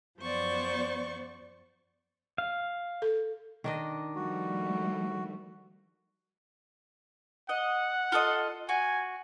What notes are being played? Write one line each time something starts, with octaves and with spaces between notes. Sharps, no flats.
F#2 F3 B3 C5 D5 C#6
F5
A4
D#3 D4 D#5
F3 G3 A3 F#4
D#5 F#5
F4 A4 D#5
F#4 G#5